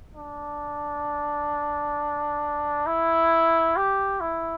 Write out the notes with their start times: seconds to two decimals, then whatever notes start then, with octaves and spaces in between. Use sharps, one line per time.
0.15 D4
2.86 E4
3.77 G4
4.21 E4